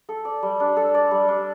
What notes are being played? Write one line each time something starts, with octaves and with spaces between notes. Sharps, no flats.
A4
D5
G3
D4
A4
D5
G3
D4